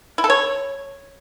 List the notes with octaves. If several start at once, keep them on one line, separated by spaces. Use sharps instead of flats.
E4
A4
C#5